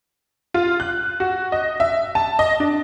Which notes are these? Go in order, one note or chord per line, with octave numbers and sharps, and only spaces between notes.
F4
F#6
F#4
D#5
E5
A5
D#5
D4